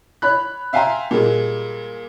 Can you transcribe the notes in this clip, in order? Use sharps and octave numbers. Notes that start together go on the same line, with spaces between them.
C#5 B5 F#6
E5 F5 G5 G#5 A#5 C6
A#2 G3 G#3